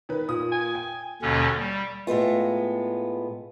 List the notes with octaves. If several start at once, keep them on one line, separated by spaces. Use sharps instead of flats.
D#3 B4
A#2 D#6
G#5
G5
D#2 B2 D3 C#4
G3
A2 G#3 B3 F4